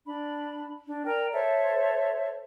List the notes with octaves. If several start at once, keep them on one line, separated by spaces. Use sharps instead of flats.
D4 B5
D4
A#4 D5 G5 A#5
A4 C5 C#5 E5